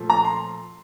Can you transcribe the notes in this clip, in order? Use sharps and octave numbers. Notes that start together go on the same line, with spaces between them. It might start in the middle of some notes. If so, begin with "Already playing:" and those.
Already playing: A#2 F3 A3
A#5
C6